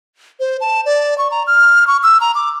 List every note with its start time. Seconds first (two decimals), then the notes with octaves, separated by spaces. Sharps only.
0.40 C5
0.61 A5
0.86 D5
1.18 C#6
1.31 A#5
1.47 F6
1.87 C#6
2.03 E6
2.21 A#5
2.35 D6